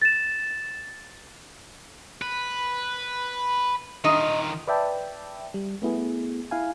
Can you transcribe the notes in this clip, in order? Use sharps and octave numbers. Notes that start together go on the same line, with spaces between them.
A6 E7
B4
D#3 D#4 F4
B4 D5 E5 G5 A5
G3
A3 B3 E4 G#4
E4 F5 G#5